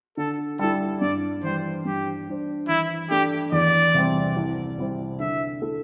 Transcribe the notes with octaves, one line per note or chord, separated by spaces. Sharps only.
D3 A4
G3 E4 A4
G2 D5
E3 G3 C5
G2 G4
G3 D4 C5
E3 E4
A3 D4 G4
E2 D5
C3 G3 C4
C2
C3 G3 E4 C5
D3 E5
A3 E4 A4